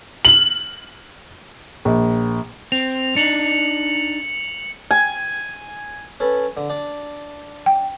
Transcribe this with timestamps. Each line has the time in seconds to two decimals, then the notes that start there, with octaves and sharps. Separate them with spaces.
0.25 F#7
1.85 A#1
2.72 C4 F7
3.16 D4 D#4 C#7 F7 F#7
4.91 G#5
6.20 C#4 A4 B4
6.57 D3
6.70 D4
7.66 G5